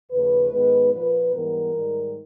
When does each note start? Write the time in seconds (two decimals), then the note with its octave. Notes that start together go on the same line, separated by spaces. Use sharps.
0.11 D#2 C#3 F3 A3 B4
0.51 G#2 D#3 G#3 B3
0.92 A#2 F3 A#3 B4
1.33 G#2 E3 G3 B3 A#4
1.74 G#2 D#3 G3